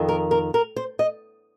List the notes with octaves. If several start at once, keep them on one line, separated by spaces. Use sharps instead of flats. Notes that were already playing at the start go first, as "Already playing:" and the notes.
Already playing: F2 D#3
A#4
A#4
A#4
C5
D#5